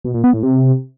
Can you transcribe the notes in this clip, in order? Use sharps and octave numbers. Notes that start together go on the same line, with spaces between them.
B2
A#2
B3
A2
C3